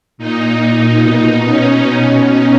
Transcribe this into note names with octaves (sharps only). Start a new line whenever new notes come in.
A#2 D#4
B2
C#4
B2 C#4
D#4